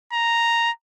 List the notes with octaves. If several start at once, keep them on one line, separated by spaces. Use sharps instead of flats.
A#5